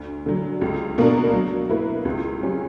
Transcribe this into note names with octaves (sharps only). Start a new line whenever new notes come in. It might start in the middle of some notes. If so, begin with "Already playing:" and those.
Already playing: D2
D3 F#3
C#2
B2 A#3 D4 A#4
F#3
A#3 E4 B4
C#2
C#3 F#3 C#4 G4